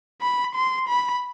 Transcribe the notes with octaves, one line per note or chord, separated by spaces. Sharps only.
B5
C6
B5